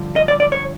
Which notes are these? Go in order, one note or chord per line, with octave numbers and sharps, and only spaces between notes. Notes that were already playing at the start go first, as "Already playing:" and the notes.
Already playing: G2 D3 F3
D#5
D5
D5
C#5